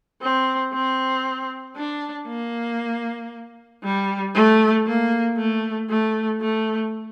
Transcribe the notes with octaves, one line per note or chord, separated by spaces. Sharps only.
C4
C4
D4
A#3
G3
A3
A#3
A3
A3
A3